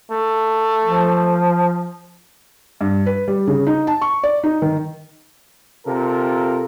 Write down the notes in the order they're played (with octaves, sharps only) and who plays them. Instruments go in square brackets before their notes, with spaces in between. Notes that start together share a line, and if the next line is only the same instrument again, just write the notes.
[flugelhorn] A3
[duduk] F3
[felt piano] G2
B4
G3
C#3
D#4
A5
C#6
D5
D#4
D#3
[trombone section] C3 F4 A4 A#4